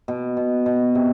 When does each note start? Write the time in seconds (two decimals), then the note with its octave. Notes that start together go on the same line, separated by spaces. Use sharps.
0.08 B2
0.37 B2
0.66 B2
0.95 C3